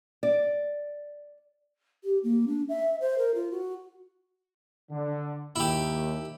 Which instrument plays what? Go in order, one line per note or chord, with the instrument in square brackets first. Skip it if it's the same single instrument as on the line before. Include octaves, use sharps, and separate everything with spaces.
[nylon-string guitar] D5
[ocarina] G4
A#3
D4
E5
C5
A#4
F4
F#4
[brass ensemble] D3
[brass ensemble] D#2 [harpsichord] E4 G4